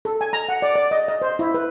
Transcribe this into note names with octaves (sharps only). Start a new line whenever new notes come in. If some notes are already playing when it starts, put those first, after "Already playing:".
A4
G#5
A#5
F#5
D5
D5
D#5
D#5
C5
E4
B4